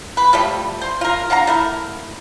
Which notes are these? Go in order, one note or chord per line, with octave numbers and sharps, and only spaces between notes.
B4
F3 G3 A3
C5
F4 A#4
D4 F5 F#5 A#5
A3 E4 A#4